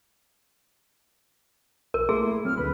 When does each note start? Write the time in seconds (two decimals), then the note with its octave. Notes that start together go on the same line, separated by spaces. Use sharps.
1.94 A#1 A#4
2.09 A3 A#3 G#4 C6
2.20 E4
2.45 F#3 C4 F6
2.58 D2 D3 B4 B5